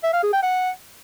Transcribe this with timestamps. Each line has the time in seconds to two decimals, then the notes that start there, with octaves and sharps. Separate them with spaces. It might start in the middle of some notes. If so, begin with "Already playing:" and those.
0.03 E5
0.13 F5
0.23 G#4
0.33 G5
0.42 F#5